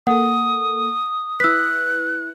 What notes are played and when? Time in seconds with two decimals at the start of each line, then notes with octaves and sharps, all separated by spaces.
0.07 A#3 A4 F#5 D#6
1.40 E4 B4 E6 F#6 B6